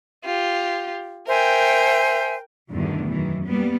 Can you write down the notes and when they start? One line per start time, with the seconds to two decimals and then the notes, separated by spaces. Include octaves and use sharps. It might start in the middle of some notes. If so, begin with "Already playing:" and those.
0.24 F4 G4
1.27 A#4 C5 E5 G5 G#5
2.71 E2 G2 B2 D3 D#3 A3
3.11 F#2 D#3 E3
3.45 G3 A#3 B3